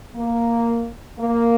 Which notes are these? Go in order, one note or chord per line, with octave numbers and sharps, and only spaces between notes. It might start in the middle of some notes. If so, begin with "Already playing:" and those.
A#3
A#3